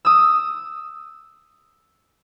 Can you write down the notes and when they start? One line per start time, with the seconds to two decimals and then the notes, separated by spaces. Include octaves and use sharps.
0.05 D#6 E6